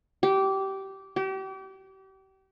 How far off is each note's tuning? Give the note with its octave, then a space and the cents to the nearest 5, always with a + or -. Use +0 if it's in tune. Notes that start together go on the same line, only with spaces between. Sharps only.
G4 -20
G4 -35